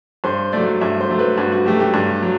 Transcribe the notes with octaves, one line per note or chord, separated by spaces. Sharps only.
G2 C5
F#3 A3 D5
G2 E5
C5
F#3 A3
B4
G2 F#4
F#4
F#3 A3 G4
G4
G2
F#3